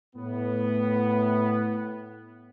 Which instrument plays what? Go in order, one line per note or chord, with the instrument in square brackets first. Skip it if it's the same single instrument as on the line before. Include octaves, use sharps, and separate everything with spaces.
[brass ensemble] A2 B3